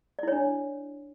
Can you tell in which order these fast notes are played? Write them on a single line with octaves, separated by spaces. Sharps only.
D5 E4 C#5 D4